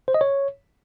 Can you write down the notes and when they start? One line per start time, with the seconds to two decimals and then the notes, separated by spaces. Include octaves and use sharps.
0.08 C5
0.14 D#5
0.21 C#5